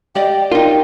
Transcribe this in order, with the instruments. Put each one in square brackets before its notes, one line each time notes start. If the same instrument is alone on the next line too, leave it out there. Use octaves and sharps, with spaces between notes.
[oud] G4 D5 D#5 [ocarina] G5
[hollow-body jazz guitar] D#4 F4 [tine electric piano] A#4 [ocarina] G5